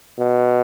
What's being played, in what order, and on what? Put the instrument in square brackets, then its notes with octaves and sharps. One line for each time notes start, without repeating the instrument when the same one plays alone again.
[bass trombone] B2